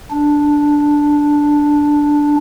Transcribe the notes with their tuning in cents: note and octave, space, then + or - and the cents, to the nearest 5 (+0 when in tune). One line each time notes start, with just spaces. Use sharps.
D4 +0